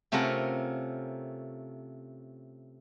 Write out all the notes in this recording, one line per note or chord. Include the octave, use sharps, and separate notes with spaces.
C3 A3 C#4 F4 A#4 F#5